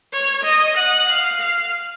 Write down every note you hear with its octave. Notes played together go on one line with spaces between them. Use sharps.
C#5
D#5
F#5
F5
F5